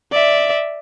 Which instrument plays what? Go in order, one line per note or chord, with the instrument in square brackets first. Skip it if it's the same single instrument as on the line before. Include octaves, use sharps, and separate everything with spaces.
[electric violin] D5 E5